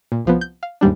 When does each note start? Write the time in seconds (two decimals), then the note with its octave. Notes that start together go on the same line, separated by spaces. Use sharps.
0.12 A#2
0.25 C2 F3 B3
0.41 G6
0.63 F5
0.81 D#2 G#2 G3 D4